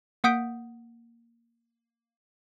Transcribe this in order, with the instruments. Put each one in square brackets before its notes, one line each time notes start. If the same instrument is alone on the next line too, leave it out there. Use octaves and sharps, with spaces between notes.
[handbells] A#3 F#5 D#6 G6 B6 D7